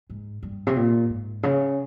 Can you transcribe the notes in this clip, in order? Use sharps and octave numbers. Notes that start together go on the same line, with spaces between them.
G#2
G2
C3
A#2
G#2
C#3